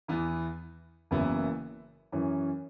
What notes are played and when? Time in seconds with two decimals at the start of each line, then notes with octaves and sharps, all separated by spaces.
0.08 E2 E3 B3 E4
1.11 F#1 F#2 E3 B3 E4
2.12 F#2 E3 C#4